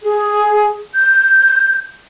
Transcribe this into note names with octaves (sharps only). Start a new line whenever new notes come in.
G#4
G6